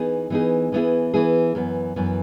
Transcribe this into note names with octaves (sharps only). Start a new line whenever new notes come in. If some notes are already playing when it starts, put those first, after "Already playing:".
Already playing: E3 B3 D#4 G#4
E3 B3 D#4 G#4
E3 B3 E4 G#4
E3 B3 E4 G#4
F#2 E3 B3
F#2 E3 B3